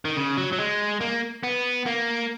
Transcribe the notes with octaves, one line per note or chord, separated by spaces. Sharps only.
D#3
C#3
F#3
F#3
G#3
A#3
B3
A#3